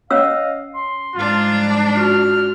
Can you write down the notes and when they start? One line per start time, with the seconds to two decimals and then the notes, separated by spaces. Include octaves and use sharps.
0.11 C#4 C#5 D#5 F5 E6
0.75 C6
1.15 G#2 D4 F4
1.45 F3 G3
1.95 F4 F#4 F6